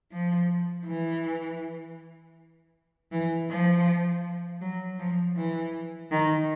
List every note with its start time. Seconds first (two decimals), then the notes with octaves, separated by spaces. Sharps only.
0.11 F3
0.86 E3
3.12 E3
3.49 F3
4.61 F#3
4.99 F3
5.37 E3
6.11 D#3